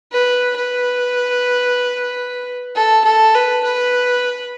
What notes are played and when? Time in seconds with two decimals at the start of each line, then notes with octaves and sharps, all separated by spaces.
0.12 B4
0.56 B4
2.76 A4
3.05 A4
3.34 B4
3.64 B4